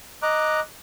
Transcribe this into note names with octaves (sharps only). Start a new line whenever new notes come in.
D#5 A#5 D6 F#6